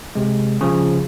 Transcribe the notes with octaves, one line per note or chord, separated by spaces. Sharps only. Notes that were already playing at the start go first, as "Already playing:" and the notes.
C3 G#3
C#3 F3